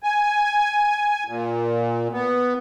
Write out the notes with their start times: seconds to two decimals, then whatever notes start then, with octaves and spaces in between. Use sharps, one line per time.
0.03 G#5
1.28 A#2
2.12 B3